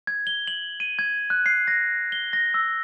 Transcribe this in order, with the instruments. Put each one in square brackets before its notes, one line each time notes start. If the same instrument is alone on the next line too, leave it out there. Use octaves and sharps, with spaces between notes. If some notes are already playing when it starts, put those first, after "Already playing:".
[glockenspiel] G#6
G7
F#7
D#7
G#6
F#6
C7
A#6
G7
A#6
E6